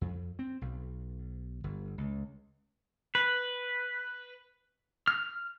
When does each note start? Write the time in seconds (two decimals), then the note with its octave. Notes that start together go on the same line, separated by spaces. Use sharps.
0.01 F2
0.39 C4
0.61 B1
1.64 G1
1.98 C#2
3.15 B4
5.08 F6